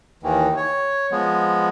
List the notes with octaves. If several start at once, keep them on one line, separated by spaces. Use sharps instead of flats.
D#2 D#3 E3
C#5
F3 G#3 B3